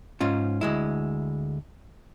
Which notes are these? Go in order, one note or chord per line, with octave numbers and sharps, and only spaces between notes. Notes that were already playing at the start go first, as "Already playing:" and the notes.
G#2 C#4 F4
D2 G#3 E4